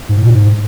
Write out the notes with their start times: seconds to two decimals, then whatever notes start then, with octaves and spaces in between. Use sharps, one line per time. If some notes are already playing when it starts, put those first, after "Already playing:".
0.09 G#2
0.16 A2
0.23 B2
0.31 G#2